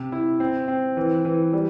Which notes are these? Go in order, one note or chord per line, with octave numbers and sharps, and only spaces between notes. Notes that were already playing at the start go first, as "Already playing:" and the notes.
Already playing: C3
E4
C4
C4
E3
E3
G3